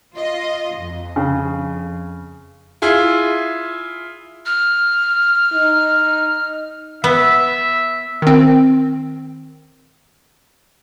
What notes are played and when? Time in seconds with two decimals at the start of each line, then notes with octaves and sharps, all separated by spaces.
0.16 F4 D#5
0.77 F2
1.16 C#3
2.82 E4 F4 G#4
4.46 F6
5.54 D#4
7.04 B3 E5
8.22 D#3 C4